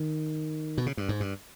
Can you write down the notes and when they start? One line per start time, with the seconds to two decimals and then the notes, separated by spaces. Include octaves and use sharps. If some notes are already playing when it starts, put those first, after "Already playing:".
Already playing: D#3
0.78 B2
0.86 C#3
0.97 G2
1.09 G#2
1.20 G2